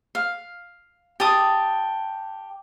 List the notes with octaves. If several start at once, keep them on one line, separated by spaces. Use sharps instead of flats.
F5
G4 A5 D#6